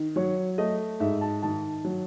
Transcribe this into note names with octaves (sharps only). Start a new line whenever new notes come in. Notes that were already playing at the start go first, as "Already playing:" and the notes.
Already playing: D#3
F#3 C#5
A3 D#5
G#2 E5
A5
D#3 A5
F#3